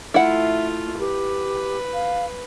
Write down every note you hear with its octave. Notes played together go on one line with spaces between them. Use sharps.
A3 E4 F4 E5 F#5
G4 B4
F5